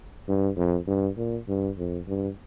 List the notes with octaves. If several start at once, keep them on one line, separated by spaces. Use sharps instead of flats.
G2
F2
G2
A#2
G2
F2
G2